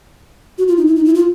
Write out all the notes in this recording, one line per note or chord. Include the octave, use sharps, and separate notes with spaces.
F#4
F4
D#4
E4
D#4
E4
F4